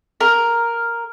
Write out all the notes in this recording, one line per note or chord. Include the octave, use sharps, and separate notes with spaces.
A#4